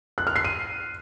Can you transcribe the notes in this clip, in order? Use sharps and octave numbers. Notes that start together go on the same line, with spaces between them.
F#6
F6
C7
D#7